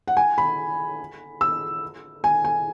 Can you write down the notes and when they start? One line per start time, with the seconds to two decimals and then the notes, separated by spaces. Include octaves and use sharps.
0.08 F#5
0.17 G#5
0.38 B5
1.41 E6
2.24 G#5
2.45 G#5